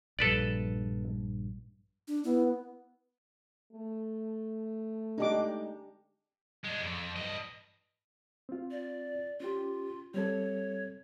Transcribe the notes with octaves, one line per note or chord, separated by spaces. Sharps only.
A#1 G2 A4 B4 D5
D4
B3 E4
A3
G#3 D4 D#4 G4 D6
G#3 D4
F2
G2 D#5
C4 F4
D5
C#4 F4 G4
G3 C4 A4 C#5